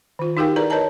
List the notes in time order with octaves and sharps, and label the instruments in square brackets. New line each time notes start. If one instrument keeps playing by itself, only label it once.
[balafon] D#3 F4
D#4 F#4 G4 A#4 F5 G5
E4 G#4 A#4 B4 D5 A#5
A#4 B4 C#5 D#5 A5 A#5